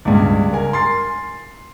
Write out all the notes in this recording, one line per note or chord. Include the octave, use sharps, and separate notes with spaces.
C#2 G2
A#4 G#5
C6 A6 C7